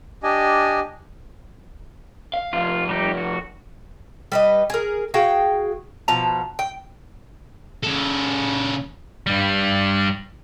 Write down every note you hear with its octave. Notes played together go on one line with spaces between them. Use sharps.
D4 G4 D#5 G#5
F5
C3 F3 F4
G3 D#4 G4
F#4
G3 B4 D#5
G#4 A#4
F#4 G#4 F5 G5
B2 F3 A5 A#5
G5
C#3 A4
G2 G3